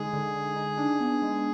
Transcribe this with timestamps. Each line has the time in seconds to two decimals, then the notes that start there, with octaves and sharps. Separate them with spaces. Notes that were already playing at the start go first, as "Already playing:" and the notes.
Already playing: D3 G#3 D#4 G#4
0.13 D3
0.36 D3
0.56 D#4
0.78 D4
1.00 B3
1.22 G#3